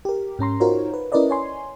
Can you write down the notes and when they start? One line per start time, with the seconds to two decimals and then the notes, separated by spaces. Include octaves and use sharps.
0.05 G4 A#4
0.39 G#2 C#4 A#5 C6
0.60 D#4 F4 F#4 A#4 C5 C#5
0.94 B4
1.12 C#4 E4 A#4 B4 D5 D#5
1.30 C#5 G#5 C6